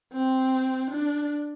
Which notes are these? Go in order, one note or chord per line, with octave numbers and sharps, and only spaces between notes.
C4
D4